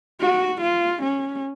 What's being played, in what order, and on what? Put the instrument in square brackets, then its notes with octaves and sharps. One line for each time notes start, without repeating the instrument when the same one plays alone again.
[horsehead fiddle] F#4
F4
C#4